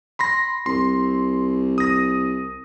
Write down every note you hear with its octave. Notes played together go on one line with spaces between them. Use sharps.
B5 C6 A#6
C2 C6
D#6 A#6